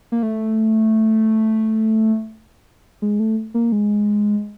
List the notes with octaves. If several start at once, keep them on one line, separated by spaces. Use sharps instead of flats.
A#3
A3
G#3
A3
A#3
G#3